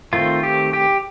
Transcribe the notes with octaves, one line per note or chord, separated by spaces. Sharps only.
D#3 A3 C4 F4
G4
G4